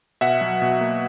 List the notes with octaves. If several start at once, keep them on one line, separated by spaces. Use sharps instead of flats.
B2 E5 F#5
F#3
B2
A#3